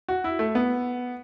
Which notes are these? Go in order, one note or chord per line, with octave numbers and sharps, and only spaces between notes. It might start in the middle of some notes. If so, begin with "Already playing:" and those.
F#4
E4
A3
B3